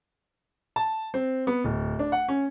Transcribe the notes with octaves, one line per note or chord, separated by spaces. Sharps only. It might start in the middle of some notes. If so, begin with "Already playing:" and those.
A5
C4
B3
D1
D4
F#5
C#4